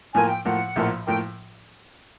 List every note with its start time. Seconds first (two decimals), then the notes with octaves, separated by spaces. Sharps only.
0.14 A2 F3 A#3 G#5
0.30 G5
0.45 A2 F3 A#3 F#5
0.76 A#1 A2 F3 A#3
1.06 A2 F3 A#3 G5